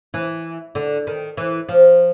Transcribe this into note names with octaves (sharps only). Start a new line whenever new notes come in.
E3
D3
D#3
E3
F3